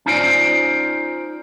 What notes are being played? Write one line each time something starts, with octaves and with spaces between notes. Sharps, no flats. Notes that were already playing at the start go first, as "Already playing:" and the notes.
C#4 D#4 F4 C5 D5